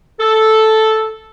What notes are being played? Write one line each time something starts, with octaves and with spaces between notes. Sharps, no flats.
A4